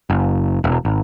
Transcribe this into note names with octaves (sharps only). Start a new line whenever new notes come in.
F#1
E1
G#1